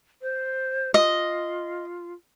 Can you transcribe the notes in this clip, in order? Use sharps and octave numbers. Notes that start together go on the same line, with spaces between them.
C5
F4 D#5